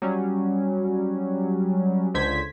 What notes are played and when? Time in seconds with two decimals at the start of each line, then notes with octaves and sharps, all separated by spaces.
0.02 F#3 G3 C#4
2.14 C#2 D3 C5 G#6 B6